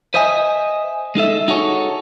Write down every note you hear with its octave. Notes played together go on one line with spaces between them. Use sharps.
B4 C5 D#5 E5 G#5
G#3 D#4 A4 E5
D#4 F#4 G#4 A4 C#5